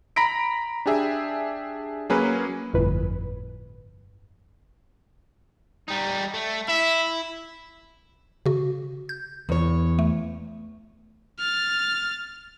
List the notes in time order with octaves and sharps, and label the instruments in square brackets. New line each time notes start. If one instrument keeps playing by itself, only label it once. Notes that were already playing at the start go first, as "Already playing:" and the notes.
[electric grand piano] A#5 B5 A#6 B6 D7
D4 G4 G#4 E5
F#3 A#3 C#4 G#4 B4
[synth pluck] G1 F2 A2 B4
[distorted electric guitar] G3 D#4
A3
[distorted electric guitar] E4 [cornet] E5
[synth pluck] C#3 F#4
G6
[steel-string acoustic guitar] E2 C#5
[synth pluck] A3
[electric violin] F6 A6